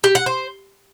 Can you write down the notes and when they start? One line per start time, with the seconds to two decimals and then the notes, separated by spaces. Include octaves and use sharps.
0.04 G4
0.15 F#5
0.26 C5